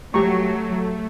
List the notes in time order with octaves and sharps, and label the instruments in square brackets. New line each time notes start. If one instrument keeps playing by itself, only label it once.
[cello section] F#3 [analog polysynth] A3 [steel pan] G4 A#5 C#6